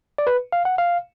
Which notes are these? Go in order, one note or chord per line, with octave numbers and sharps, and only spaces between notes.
D5
B4
F5
F#5
F5